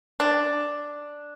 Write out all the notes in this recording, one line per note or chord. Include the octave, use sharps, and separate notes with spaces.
D4